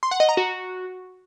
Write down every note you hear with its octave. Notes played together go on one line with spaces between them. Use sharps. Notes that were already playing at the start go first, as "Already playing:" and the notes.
C6
F#5
D#5
A#5
F#4